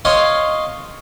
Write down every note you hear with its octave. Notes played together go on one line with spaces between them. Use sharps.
C#5 D#5 F5 C6